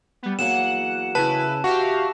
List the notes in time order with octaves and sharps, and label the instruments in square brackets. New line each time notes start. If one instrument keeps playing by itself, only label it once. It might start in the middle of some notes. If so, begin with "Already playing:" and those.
[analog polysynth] G3 B3
[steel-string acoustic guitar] E2 F#3 A#3 [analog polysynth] F#5 [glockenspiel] E7
[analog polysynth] C#3 E4 [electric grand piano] B4 [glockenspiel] A5
[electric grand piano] F#4 [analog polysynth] G4 E5 F5